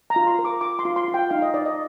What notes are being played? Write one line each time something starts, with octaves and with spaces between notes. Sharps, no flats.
A#5
F4
C6
A#4
D6
F4 D6
C6
F4
C6
F4
G5
D#4 F5
D#5
D#4 D5
D#5